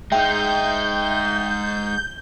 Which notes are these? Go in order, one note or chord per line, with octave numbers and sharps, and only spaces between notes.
G#3 D#4 E5 G5 G6